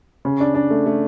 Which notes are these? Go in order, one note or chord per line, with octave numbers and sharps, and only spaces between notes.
C#3
D4
D4
A3
A3